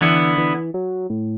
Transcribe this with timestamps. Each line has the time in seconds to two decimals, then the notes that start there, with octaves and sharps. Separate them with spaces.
0.01 D3 E3 B3 E4
0.38 E3
0.74 F#3
1.10 A2